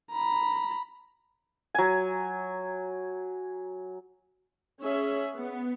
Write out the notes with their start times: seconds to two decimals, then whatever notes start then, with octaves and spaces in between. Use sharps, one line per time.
0.12 A#5 B5
1.74 F#3 G#5
4.82 C#4 G#4 E5
5.35 B3